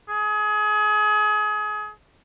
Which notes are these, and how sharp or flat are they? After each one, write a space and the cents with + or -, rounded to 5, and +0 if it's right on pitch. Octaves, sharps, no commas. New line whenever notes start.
G#4 +30